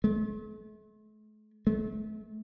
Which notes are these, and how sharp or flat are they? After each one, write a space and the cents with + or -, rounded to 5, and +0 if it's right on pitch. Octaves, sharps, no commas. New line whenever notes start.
A3 -45
A3 -35